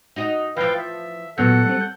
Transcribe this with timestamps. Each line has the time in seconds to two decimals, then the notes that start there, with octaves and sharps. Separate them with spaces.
0.16 D#4 F#4 D#5
0.57 E3 F3 B4 F5 G5
0.78 E5
1.38 A#2 F#3 B3 A4 F#5 G6
1.65 G3 C4
1.81 G6